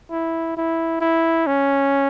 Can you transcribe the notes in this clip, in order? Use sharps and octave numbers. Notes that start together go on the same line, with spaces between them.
E4
E4
E4
C#4